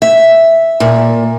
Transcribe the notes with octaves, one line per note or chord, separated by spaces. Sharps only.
E5
A#2